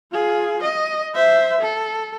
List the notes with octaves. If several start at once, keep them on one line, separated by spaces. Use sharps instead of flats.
F4 G#4
D#5
C5 E5
A4